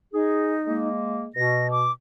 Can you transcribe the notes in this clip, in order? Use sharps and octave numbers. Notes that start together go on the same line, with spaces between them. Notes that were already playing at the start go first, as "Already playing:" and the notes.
D#4 G#4
G#3 A#3
B2 A#6
D6